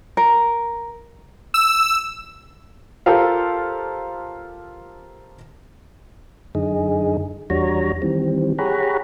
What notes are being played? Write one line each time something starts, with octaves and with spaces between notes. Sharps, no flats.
A#4
E6
F4 G4 A4 A#4 C5 F5
F#2 D3 D#4 G#4
E2 G3 D4 F#4 C#5 A#5
D#3 E3 G3 C4
G4 G#4 C#5 F#5 A#5 B5